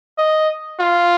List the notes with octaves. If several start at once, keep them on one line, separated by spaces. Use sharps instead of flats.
D#5
F4